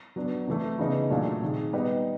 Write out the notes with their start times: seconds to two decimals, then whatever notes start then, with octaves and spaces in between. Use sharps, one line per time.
0.16 F#3 B3 D4
0.47 C3 E3 A3
0.79 C#3 E3 G#3 B3 D#4
1.10 A#2 F#3 A3 D4 F4
1.42 C3 D#3 G#3
1.73 G3 B3 D#4 G4 B4